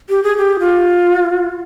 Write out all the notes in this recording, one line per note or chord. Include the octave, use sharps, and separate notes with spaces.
G4
G#4
G4
F4